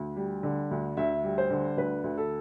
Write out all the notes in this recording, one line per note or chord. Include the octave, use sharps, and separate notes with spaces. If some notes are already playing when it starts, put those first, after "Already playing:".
Already playing: D2
G3
D3
D2
D2 E5
G3
C5
D3
D2 B4
D2
A4